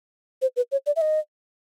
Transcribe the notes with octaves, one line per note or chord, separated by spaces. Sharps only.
C5
B4
C#5
D5
E5
D#5